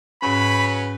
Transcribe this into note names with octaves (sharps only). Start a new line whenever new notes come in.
G#2 C#3 F#3 C#4 B4 B5